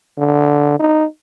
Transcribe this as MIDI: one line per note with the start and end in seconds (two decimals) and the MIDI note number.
0.18 0.77 50
0.80 1.05 63